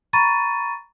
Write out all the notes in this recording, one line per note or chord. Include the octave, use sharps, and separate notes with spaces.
A#5 B5 C#6 A6 D#7